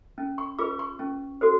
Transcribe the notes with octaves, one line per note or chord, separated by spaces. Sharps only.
C#4
C#6
F4 G#4 B4 D6
C#6
C#4
F#4 A4 C5